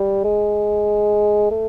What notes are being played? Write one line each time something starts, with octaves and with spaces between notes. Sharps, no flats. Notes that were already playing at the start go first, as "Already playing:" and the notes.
Already playing: G3
G#3
A3